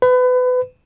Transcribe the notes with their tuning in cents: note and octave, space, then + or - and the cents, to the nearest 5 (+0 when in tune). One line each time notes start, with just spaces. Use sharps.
B4 +30